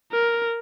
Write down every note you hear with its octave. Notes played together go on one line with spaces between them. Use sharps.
A#4